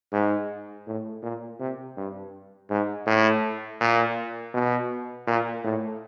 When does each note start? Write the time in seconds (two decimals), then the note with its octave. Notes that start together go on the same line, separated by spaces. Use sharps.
0.13 G#2
0.87 A2
1.23 A#2
1.60 C3
1.97 G2
2.70 G#2
3.07 A2
3.80 A#2
4.54 B2
5.27 A#2
5.64 A2